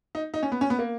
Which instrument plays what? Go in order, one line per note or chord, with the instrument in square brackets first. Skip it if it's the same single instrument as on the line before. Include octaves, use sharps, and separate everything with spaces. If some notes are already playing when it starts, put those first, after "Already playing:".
[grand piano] D#4
D#4
C#4
B3
C#4
B3
A#3